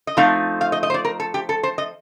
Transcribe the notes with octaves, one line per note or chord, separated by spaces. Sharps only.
D#5
F3 A3 C4 D#4 F5
F5
D#5
D#5
C5
D5
A#4
A4
G4
A4
C5
D#5